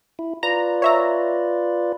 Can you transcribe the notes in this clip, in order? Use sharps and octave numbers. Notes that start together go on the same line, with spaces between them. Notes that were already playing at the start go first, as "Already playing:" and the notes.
E4
F4 B4 D5 A#5
C#5 E5 A#5